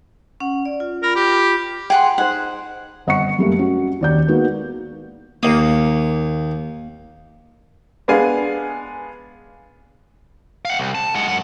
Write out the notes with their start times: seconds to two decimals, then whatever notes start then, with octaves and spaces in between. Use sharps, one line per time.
0.40 C#4 F#5
0.65 D5
0.80 F4
1.03 F4 A#4 B5
1.16 G4
1.90 G#4 F#5 G5 C6
2.18 D#4 G#4 C5 F#5
3.07 G1 D#5 F#5 C#6 C#7
3.38 F#2 G3 A3 A#3
3.59 C#4 F#4
4.01 D#2 D5 G6
4.28 G#3 A#3 B3 D#4 F#4
5.43 D#2 A#3 D#6
8.08 G#3 B3 D4 G#4 F5 G#5
10.65 F5 F#5
10.78 C2
10.95 A5
11.15 G#3 F#5
11.28 F#2 F#5